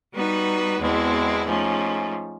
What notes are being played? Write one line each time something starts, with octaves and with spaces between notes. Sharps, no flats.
G3 B3 D#4 F#4 B4
E2 B2 G#3 C4 E4
G#2 F3 A3 C#4